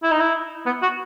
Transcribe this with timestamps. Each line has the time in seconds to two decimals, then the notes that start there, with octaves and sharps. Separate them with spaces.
0.03 E4
0.11 D#4
0.20 E4
0.66 B3
0.82 F#4